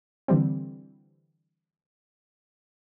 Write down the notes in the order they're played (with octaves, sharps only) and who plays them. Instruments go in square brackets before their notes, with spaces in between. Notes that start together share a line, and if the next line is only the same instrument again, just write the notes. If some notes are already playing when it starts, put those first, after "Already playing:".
[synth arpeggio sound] D3 E3 G3 C4